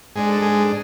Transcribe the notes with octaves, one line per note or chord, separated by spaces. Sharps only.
G#2 G#3 D4 G#4
A4
G#3 G#4